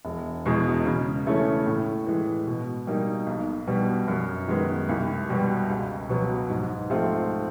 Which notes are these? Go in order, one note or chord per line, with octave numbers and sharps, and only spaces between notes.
E1
E2 B2 G#3
C#3
E3 A3 C#4
A2
E3 G#3
B2
G3 A#3 D#4
B1
B2 G3 B3
F#2
D#3 G#3 B3
C2
B2 G3 B3
C#2
B2 F#3 B3
G#2
F3 A3 C4 F4